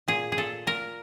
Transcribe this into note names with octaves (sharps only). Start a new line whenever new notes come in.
A#2 G#4
G#4
A#2 A4
A#2 A#4